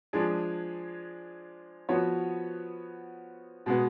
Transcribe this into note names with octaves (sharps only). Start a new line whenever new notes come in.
F3 G#3 D4 G#4
F3 B3 F#4 C#5
B2 G#3 B3